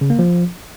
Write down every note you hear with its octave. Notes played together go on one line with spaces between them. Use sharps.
C#3
A#3
F3